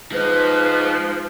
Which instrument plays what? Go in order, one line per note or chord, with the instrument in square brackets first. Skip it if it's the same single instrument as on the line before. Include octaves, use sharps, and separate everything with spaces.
[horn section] F3 [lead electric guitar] G#3 D#4 [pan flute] B4